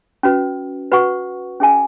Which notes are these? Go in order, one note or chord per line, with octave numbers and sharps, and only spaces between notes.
C#4 F#4 B4
F#4 B4 F#5 C#6
C#4 G#4 E5 G#5